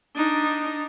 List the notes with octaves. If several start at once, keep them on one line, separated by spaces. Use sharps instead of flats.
D4 D#4